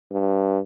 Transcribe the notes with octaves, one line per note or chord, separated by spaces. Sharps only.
G2